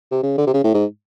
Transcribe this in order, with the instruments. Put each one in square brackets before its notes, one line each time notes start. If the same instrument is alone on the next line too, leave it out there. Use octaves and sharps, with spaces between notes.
[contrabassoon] C3
C#3
D3
C3
C#3
A2
G#2